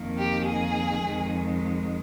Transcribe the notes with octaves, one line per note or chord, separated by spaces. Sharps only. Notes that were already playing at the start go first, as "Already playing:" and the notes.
Already playing: F2 D#3 A#3
G4
G#4
F2 D#3 G#3